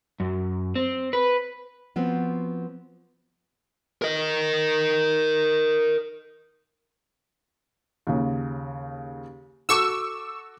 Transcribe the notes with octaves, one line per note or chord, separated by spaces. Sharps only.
F#2
C4
B4
F3 B3 C4 F#4
A#4 D#5
D#2 C#3
F#4 A4 C#6 D6 E6